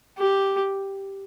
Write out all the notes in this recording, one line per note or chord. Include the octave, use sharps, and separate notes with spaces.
G4